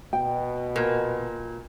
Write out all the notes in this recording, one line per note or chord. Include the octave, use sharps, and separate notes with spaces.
B2 G5
A#2 A#4